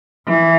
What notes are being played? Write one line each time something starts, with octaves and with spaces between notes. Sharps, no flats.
E3